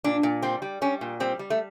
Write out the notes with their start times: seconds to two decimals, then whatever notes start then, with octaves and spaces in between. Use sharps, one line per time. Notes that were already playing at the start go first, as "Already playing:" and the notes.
0.04 A#2 D4
0.23 A#2
0.42 G3 C4
0.62 G3
0.82 G3 C#4
1.01 A#2
1.20 G3 C4
1.39 G3
1.50 A3